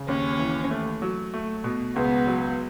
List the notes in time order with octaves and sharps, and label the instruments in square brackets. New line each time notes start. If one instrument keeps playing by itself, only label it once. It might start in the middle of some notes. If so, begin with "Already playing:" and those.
Already playing: [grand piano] C#3
[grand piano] D#2 [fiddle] C#4
[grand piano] E3
A3
F#3
A3
B2
[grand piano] C#2 [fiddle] B3
[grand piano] F#3